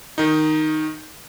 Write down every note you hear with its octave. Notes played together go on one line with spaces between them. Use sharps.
D#3 D#4